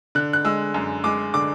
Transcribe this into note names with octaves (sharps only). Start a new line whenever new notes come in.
D3 F#6
F#6
G#3 E6
F#2
G#3 D6
D3 D6